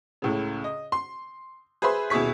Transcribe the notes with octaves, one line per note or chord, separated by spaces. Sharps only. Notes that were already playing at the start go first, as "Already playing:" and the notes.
C#2 A2 C#3
D#5
C6
G#4 B4 C5 E5 B5 C6
D#1 B2 E4 G#4 C#6 B6